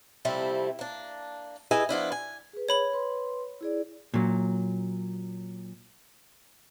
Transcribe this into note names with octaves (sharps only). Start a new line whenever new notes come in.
C3 F3 G3 A3 C4 E4
A#3 D4
E4 G#4 B4 D#5 E5 G#5
F3 B3 D4 E4
G#5
G#4 B4
C#5 B5 F#7
B4 C6
E4 G#4 D5
A#2 F#3